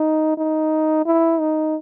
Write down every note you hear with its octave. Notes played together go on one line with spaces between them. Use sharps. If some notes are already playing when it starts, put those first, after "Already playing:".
Already playing: D#4
D#4
E4
D#4